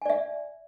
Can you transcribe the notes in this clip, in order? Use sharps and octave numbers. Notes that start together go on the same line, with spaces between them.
D5 E5 G#5